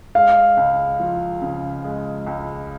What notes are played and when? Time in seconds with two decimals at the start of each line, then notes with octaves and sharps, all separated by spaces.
0.15 G#3 F5
0.57 C#2
1.00 F3
1.42 C#3
1.84 G#3
2.26 C#2